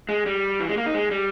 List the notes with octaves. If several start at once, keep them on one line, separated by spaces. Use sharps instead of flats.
G#3
G3
E3
G#3
A#3
D#4
G#3
G3